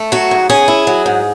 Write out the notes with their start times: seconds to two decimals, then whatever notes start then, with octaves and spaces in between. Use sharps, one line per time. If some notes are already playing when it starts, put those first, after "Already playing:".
Already playing: A3
0.12 F#3 F#4
0.31 G#2
0.49 C#4 G#4
0.68 E4
0.87 F#3
1.06 G#2